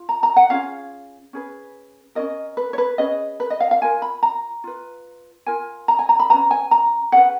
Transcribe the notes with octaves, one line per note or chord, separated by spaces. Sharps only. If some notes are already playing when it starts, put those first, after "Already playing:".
Already playing: F4
A#5
A#5
F#5
C#4 F4 G#4 F5
C#4 G#4 B4
C#4 F4 A#4 D#5
B4
C#5
B4
C#4 G#4 B4 D#5
B4
D#5
F5
F5
F4 A#4 G#5
B5
A#5
F4 B4
F4 A#4 G#5
A#5
G#5
A#5
B5
C#4 F4 B4 A#5
G#5
A#5
C#4 G#4 B4 F#5